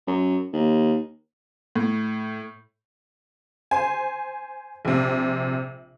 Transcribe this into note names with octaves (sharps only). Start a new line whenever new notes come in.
F#2
D#2
A2
C5 G#5
A#1 C3